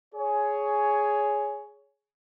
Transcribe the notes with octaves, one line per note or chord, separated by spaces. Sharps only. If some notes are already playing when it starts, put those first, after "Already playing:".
G#4 C#5